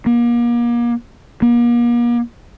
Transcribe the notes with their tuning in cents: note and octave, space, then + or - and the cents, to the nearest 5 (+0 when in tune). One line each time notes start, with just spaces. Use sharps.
A#3 +35
A#3 +40